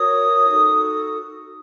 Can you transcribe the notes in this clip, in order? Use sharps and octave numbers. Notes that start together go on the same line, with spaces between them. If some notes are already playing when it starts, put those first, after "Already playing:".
Already playing: F#4 A#4 C#5 D#6
D#4 F#4 A4